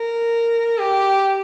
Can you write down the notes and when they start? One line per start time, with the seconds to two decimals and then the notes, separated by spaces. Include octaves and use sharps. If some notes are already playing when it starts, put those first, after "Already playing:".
Already playing: A#4
0.78 G4